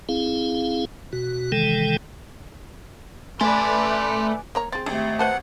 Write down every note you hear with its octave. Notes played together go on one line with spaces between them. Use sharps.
C4 E4 G#4 F5
B2 F#4
C3 D#3 E3 G#3 A4 G5
A3 B4 D5 E5 G#5 C6
A#3 C#5 A#5
C4 G#4 A6
G#1 A3 G4
B4 C5 F#5 A5